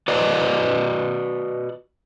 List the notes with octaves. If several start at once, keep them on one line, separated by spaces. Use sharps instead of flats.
F#4 B4 D5 D#5